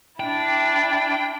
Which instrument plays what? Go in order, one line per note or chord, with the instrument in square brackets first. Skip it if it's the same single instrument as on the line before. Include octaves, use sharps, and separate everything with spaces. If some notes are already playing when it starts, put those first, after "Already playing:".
[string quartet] D4 E4 [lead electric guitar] G5